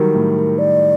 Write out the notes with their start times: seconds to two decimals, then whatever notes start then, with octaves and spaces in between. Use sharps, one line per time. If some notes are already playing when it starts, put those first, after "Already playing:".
Already playing: D#3 F#3 G3 A#4
0.14 A2
0.59 D5